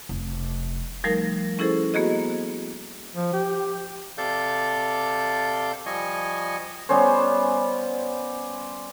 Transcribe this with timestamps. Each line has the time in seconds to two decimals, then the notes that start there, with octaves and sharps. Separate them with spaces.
0.09 F1
1.04 F3 G3 A3 D#4 A#4
1.59 C#4 E4 G#4 A4 C5
1.94 A#3 B3 F#4 G#4 D#5
3.15 F3
3.33 G4
4.18 C3 A4 D5 F5 G6
5.86 F3 G3 D#5 G#5 C#6
6.89 G3 B3 C#4 C5